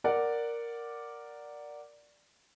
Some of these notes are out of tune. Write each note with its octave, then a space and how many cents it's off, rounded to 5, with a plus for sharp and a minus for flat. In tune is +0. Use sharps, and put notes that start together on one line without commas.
A#4 +0 D5 +0 F#5 +0